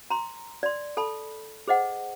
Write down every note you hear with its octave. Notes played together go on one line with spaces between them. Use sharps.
A#5 C6
D5 C6
A4 A5 B5
G#4 C5 D#5 F#5